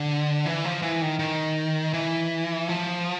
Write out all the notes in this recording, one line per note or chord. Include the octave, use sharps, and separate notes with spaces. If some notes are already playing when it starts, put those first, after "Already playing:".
Already playing: D3
E3
F3
E3
D#3
D#3
E3
F3